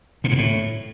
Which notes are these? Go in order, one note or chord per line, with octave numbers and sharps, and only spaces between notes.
A#2
G#2
A2